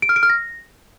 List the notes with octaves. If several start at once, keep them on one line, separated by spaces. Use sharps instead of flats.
D7
F6
D7
F6
A#6